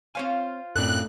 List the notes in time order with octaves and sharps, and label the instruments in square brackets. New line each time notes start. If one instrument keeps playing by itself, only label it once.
[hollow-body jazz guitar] C4 C#5 G#5 [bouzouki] F4 C5 F5
[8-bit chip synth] F#2 A2 C4 [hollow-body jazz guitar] A3 D4 A4 [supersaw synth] F#6